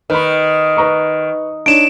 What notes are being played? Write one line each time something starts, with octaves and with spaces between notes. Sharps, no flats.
D#3 B4 B5
B4 A#5 C#6
D4 D#4 C#5 D7 E7